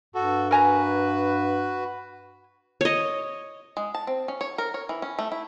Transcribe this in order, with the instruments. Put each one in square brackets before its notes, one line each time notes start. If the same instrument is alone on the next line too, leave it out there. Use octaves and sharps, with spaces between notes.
[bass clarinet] G2 [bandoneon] F#4 A4
[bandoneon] F#4 B4 [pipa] A#4 G#5 A#5
[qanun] C#5 D#5
[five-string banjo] G#3
A5
C4
C#4
C#5
A#4
C#5
E3
C#4
A3
E4